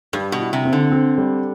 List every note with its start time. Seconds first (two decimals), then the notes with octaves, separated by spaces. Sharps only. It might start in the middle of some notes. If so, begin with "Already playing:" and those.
0.13 G2 G3
0.32 B2
0.40 E4
0.53 C3
0.65 C4
0.73 D3
0.92 C4
1.18 G3